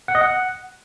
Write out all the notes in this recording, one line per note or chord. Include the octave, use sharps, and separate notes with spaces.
F#5
D#5
F#5